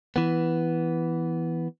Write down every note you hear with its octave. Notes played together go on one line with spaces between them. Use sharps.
E3 B3